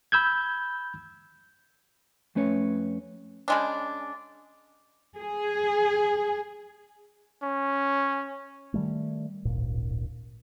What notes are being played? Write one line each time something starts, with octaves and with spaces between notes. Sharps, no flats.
B5 E6 G6 G#6
F2 A3 C#4 B4 C#5
C#3 G#3 D4
G#4
C#4
D#3 G3 A3
D1 G#1 A#2